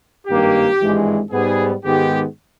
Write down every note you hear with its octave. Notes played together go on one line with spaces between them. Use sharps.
G#1 G2 D#3 A#3 G4
G#1 G2 E3 G#3
G#2 G3 B3 G#4
G#2 D#3 G#3 B3 G4